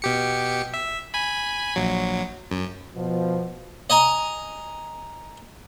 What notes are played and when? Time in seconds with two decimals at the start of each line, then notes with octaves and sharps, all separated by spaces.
0.02 B2 G4 C#7
0.74 E5
1.14 G#5 B5
1.76 A#1 F#3
2.51 F#2
2.96 B2 F3
3.90 D#5 G#5 A#5